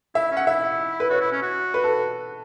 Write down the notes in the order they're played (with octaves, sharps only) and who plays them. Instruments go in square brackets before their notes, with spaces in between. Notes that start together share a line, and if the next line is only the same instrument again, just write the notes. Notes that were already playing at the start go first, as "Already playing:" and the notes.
[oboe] E4 [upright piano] E5
[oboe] C#4
[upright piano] F#5
[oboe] E4 [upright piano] E5
[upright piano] B4
[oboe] F#4 [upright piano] C#5
[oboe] E4
C#4
F#4
[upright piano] B4
A4